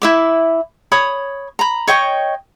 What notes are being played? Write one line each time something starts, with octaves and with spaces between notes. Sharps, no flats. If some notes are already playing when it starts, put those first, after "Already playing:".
E4 E5 D6
C#5 B5 D#6
A#5 B5
C#5 D#5 G5 C#6